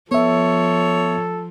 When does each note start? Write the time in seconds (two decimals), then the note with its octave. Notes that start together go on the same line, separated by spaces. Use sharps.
0.11 F3 B3 A4 C#5 E5